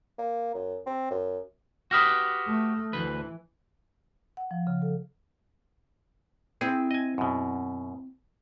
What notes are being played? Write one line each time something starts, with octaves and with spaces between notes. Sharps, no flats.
A#3
F#2
C4
F#2
F#4 G4 B4 D#6 F6 A#6
A3
D2 E3 B4
F#5
F3
C#3
A4
C4 E4 G#4
D#5 G#5
F#2 B2